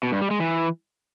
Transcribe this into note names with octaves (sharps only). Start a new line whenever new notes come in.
B2
G2
G3
G#3
E3